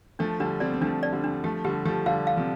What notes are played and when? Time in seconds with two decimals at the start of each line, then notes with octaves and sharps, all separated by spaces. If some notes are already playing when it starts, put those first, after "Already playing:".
0.19 F3 A3 D4
0.40 D3 G3 D4
0.60 G3 C4 D5
0.74 C4
0.81 F3 A3 D4
1.03 D5
1.13 D3 G3
1.24 D4
1.44 F3 A3 G4
1.64 D3 G3 G4
1.85 F3 A3 G4
2.06 D3 G3 F5
2.27 F5
2.37 C3 F3